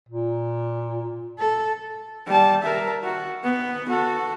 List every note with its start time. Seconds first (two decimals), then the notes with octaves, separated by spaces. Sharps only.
0.09 A#2
1.39 A4
2.27 G3 A5
2.63 A#4 E5
3.04 F#4
3.43 B3
3.89 F#4 A4